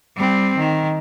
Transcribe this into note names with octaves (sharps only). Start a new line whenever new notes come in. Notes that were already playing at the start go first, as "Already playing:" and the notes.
G3 C4
D#3